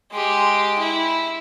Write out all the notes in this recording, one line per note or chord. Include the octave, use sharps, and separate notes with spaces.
G#3 G4
E4